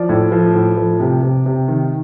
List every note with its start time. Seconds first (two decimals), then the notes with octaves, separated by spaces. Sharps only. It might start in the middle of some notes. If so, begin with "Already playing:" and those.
Already playing: F3 D5
0.09 A2
0.32 F3
0.55 A2
0.77 F3
1.00 C3
1.23 C3
1.46 C3
1.68 D#3